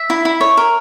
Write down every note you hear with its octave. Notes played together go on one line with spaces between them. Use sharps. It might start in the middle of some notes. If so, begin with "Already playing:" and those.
Already playing: E5
E4
E4
C#5
A#4